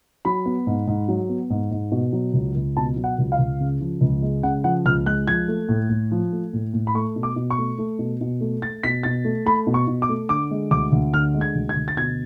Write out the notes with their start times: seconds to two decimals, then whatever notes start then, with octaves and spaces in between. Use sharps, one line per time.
0.25 F#3 B5
0.46 B3
0.67 G#2
0.87 G#2
1.08 F#3
1.29 B3
1.50 G#2
1.71 G#2
1.92 B2
2.13 F#3
2.34 C#2
2.55 C#2
2.77 B2 A5
2.96 F#3
3.04 F#5
3.18 C#2
3.32 F5
3.39 C#2
3.60 C#3
3.81 F3
4.01 C#2
4.22 G#3
4.43 C#3 F#5
4.64 F3 F#5
4.86 C#2 F6
5.06 G#3 F#6
5.27 F3 G#6
5.48 A3
5.69 A2
5.89 A2
6.12 F3
6.32 A3
6.53 A2
6.74 A2
6.87 B5
6.95 A3 C#6
7.16 B2
7.23 D6
7.36 B2
7.50 C#6
7.58 A3
7.78 A3
7.99 B2
8.21 B2
8.41 A3
8.62 A3 A6
8.83 B2 B6
9.03 B2 A6
9.25 A3
9.46 A3 B5
9.67 B2
9.74 C#6
9.87 B2
10.02 D6
10.09 A3
10.29 D3 D6
10.51 G#3
10.71 D2 D6
10.92 D2
11.13 D3 F6
11.34 G#3
11.41 G#6
11.55 D2
11.69 G#6
11.76 D2
11.88 A6
11.97 B2 G#6